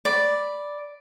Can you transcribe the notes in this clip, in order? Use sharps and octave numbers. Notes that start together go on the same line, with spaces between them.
D5 B5